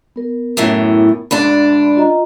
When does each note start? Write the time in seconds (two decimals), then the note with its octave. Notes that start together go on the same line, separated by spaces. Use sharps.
0.16 B3 A#4
0.57 F#2 A2 E3
1.31 D2 G#2 D4 B5
1.97 F4 D#5 A#5